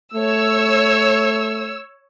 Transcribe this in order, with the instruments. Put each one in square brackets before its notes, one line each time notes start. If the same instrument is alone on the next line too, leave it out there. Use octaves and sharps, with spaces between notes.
[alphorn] A3 [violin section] C#5 E6